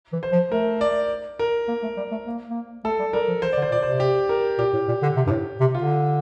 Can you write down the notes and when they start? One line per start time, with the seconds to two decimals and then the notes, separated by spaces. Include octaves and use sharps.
0.13 E3
0.23 C5
0.32 F3
0.51 A3 A#4
0.81 D5
1.39 A#4
1.68 A#3
1.83 A3
1.97 G3
2.11 A3
2.26 A#3
2.49 A#3
2.84 A3 A4
2.99 G3
3.13 G3 A#4
3.28 F3
3.42 E3 C5
3.53 D3 D5
3.62 C5
3.71 A#2 D5
3.82 C5
3.86 C3
4.00 G4
4.29 A#4
4.59 A#2 G4
4.73 A2
4.88 A#2
5.02 D3
5.16 C3
5.27 G2
5.31 A2
5.60 C3
5.75 D3 F4